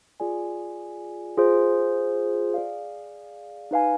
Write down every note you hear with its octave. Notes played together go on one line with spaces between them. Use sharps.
F4 G#4 D5 G#5
F4 G#4 C5
G#4 D5 F5
D#4 B4 F5 G#5